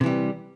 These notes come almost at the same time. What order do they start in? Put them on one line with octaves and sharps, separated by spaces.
C3 E3 G3